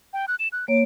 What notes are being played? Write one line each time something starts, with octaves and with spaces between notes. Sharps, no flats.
G5
F#6
E7
F#6
A#3 C#5 D7